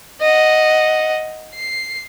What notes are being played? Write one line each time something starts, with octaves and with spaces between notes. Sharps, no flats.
D#5 F#5
C7